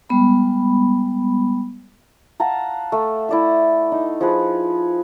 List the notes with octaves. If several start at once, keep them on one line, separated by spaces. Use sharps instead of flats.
G3 G#3 B3 B5
F5 F#5 A5 A#5
A3
E4 D5 E5
D#4
F3 G#4 B4